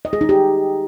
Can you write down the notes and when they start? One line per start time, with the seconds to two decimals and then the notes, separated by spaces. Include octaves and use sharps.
0.05 D#5
0.13 G#4
0.21 D#4
0.29 G4